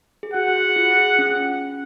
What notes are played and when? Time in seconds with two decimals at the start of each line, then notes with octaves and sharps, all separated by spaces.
0.23 G#4
0.34 F#4 F#5
0.48 F#4
0.62 G#4
0.76 F4
0.91 G#4
1.19 C#4